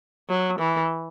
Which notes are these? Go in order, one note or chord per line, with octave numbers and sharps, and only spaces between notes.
F#3
E3